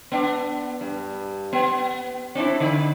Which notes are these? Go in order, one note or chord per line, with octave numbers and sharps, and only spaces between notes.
B3 D4
G2
B3
C4 D4 E4
D3